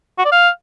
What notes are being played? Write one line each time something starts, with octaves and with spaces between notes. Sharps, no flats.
F#4
D5
F5